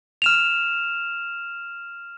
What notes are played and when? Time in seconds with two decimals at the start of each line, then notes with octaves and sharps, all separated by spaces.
0.22 F6 E7 F7